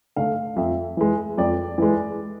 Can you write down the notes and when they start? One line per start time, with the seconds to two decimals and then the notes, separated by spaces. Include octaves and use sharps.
0.16 D3 A3 F5
0.56 F2 E5
0.97 E3 G#3
1.38 F2 D5
1.78 E3 G#3